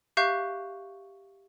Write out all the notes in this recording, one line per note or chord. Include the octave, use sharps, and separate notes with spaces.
G4 E5 F5 C#6 F#6 G6